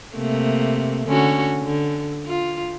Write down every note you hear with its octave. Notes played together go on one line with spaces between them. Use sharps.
C3 A3 A#3
D3 C#4 F#4
D3
F4